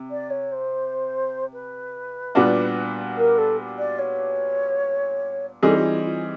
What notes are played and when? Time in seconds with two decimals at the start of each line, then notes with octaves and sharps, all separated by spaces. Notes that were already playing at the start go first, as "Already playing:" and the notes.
Already playing: C3
0.11 D5
0.30 C#5
0.51 C5
1.53 B4
2.35 A#2 G3 B3 D4 F#4
3.17 A#4
3.37 A4
3.78 D5
3.98 C#5
5.63 E3 G3 C4 D#4 G#4 A4
5.77 F#4
5.83 F4
6.04 F4